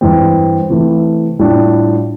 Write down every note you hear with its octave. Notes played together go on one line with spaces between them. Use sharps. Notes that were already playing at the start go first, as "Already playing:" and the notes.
G2 E3 G3 C4
C3 E3 A3
A2 G3 D4 F4